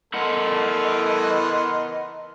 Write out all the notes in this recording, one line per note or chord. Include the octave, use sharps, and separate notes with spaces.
E3 B3 E4 A4 A#4 D#5 F#5 C6